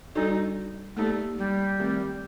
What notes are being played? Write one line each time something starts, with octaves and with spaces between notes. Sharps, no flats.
G3 D4 D#4 F#4 A4 D5
A3 A#3 D#4 G4 D5
G3
D#3 A3 C4 G4